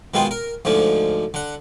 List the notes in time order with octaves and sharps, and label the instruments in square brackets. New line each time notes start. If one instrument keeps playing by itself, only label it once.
[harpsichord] B2 D#3 G#3 C4 F4
A#4
D2 G#2 D3 F3
D3 F#5